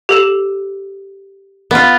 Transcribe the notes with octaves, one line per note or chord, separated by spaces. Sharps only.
G4 A4 E7
B3 F4